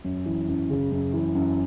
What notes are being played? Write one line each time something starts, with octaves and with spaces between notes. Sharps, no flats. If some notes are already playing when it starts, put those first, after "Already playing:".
F#2
E3
F#2
C#3
F#2
E3
F#2